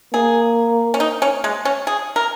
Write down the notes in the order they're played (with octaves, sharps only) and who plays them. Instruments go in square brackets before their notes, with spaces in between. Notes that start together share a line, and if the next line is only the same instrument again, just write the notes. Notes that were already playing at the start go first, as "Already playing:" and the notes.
[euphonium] A#3 [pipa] G#4
[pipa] C#4
D#4
C#4
G#3
C#4
G#4
A#4